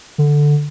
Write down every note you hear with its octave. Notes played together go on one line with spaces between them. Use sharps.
D3